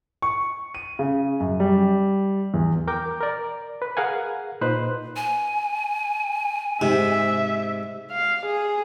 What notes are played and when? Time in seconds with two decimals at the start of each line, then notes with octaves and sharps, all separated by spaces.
0.22 C#6
0.75 D#7
0.99 C#3
1.40 F#2
1.60 G3
2.54 E2
2.88 A#4 G5 D6 G6
3.20 A#4 D5
3.82 B4
3.97 G#4 A#4 F5 F#5 G#5
4.61 A#2 D#4 B4 C5 F#6
5.16 G#5
6.81 G#2 C3 E5
8.12 F5
8.45 G#4